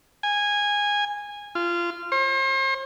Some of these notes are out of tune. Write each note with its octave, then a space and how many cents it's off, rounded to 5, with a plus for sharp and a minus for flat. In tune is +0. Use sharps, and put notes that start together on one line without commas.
G#5 -15
F4 -20
C5 +40